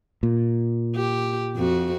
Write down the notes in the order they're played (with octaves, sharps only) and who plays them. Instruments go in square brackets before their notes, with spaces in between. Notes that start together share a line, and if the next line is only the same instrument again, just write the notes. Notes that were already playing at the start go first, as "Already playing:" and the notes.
[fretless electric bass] A#2
[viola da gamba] G4
F2 F#4